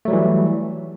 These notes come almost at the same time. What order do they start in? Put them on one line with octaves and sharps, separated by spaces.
A3 F#3 G3 E3